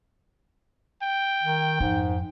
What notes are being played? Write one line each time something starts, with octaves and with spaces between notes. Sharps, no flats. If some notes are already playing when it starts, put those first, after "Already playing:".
G5
D#3
F2 G#2